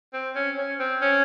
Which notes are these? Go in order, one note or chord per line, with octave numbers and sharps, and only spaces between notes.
C4
C#4
C#4
C4
C#4